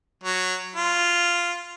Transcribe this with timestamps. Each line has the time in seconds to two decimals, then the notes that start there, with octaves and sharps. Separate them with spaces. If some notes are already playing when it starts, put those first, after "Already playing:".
0.23 F#3
0.76 F4